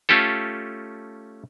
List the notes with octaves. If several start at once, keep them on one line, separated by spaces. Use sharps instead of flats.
A3 C#4 F4 G4 A4